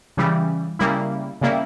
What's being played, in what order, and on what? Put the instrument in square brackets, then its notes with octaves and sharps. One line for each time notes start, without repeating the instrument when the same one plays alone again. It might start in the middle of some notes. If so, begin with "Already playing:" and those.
[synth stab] C#3 E3 G3
C#3 G3 A#3 E4
C#3 G3 A#3 E4